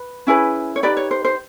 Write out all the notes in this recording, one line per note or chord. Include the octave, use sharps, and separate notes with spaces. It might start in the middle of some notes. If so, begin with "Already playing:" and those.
Already playing: B4
C#4 E4 G#4 B4
C#5
D#4 G4 B4 D5
C#5
C5
C5